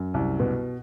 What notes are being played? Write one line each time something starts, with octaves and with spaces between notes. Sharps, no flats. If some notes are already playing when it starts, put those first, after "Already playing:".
Already playing: F#2
C2
B2